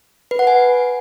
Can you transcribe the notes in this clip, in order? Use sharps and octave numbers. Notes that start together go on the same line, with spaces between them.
B4
F#5
G#5